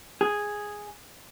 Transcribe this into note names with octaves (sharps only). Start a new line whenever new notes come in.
G#4